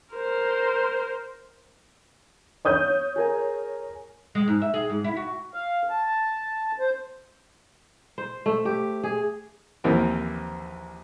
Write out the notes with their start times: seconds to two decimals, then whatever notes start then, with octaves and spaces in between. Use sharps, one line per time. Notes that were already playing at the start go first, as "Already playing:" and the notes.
0.14 A#4 C5
2.65 C#5 D#6 G6
3.16 G#4 A#4 G#5
4.35 G#3
4.48 G#2
4.62 E5
4.74 G#4
4.90 G#2
5.04 E4
5.17 F#4
5.54 F5
5.90 A5
6.80 C5
8.18 C5
8.46 A3
8.65 G4
9.04 G#4
9.84 A#1 D#2 E3 A#3 C4